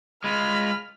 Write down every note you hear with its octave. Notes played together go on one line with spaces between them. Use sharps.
G#3 F4 B5 F6